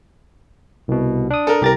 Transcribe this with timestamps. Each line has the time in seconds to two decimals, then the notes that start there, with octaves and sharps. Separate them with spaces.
0.88 C2 B2
1.30 D4 D#6
1.47 A4 A#4
1.62 C2 G4 A#4 A6 A#6